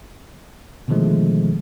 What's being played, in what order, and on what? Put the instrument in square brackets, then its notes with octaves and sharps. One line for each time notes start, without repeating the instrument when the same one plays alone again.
[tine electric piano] B2 D3 D#3 F3 G#3 A3